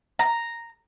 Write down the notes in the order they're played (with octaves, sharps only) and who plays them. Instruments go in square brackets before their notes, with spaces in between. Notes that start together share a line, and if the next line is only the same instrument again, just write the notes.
[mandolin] A#5